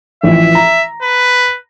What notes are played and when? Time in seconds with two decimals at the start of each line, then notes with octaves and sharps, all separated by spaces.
0.23 A1 E3 F3 E5
0.55 A#5
1.02 B4